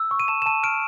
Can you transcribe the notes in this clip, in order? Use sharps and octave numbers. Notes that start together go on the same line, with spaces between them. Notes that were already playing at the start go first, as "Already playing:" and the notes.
Already playing: E6
C#6
D#7
A5 E7
E7
A5 D#7
F6 D7